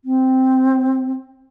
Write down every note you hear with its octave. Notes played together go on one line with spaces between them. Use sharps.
C4